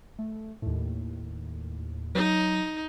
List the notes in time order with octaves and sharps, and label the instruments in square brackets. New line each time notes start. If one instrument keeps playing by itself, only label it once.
[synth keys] A3
D#2 A2
[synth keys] F#3 [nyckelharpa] D#4